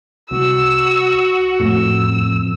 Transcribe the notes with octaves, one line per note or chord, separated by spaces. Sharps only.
C2 F#4 E6
F2 A2 E6